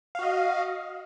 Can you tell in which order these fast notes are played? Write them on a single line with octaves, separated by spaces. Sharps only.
F5 F#4 D#5